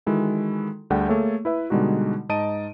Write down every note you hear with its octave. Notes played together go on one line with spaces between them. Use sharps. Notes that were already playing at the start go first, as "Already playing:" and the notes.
D#3 E3 G#3 E4 F#4 A4
D2 D3 G3 G#4 F#5 G5
A3 A#3 G#4 A4 C#5 E5
E4 B4 E5
B2 D3 G3 G#3 D#4 F#4
G#2 D#4 D#5 A5 D7 D#7